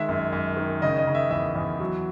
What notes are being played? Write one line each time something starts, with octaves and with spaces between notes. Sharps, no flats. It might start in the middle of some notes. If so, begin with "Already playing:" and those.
Already playing: D#3 G#3 E5
F#2
F#2
D#3
C#3 D#5
D#5
C#3
E5
E2 E5
E2
F#3